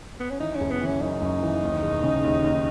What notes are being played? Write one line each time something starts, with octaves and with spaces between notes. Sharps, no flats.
B3
C#4
E3 D#4
C#4
F#1
B3
E3
C#4
F#2 D#4
F#2
E3
D#2
E1
C#3
D#2
D#2